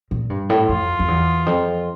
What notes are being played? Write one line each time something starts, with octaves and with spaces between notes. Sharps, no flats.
A#2
G2
A2
F2 F4
F2
E2
F2